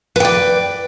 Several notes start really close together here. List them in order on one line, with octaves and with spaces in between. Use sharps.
B4 G5 D5